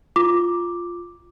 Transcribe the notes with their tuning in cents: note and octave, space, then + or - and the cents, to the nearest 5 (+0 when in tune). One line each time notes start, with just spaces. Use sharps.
F4 +0 D6 +0